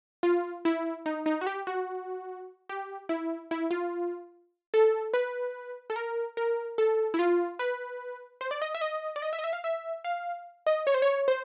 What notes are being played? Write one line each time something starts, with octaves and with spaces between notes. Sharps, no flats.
F4
E4
D#4
D#4
F#4
G4
F#4
G4
E4
E4
F4
A4
B4
A4
A#4
A#4
A4
E4
F4
B4
C5
D5
D#5
E5
D#5
D5
D#5
E5
D#5
E5
F5
E5
F5
D#5
C#5
C5
C#5
C5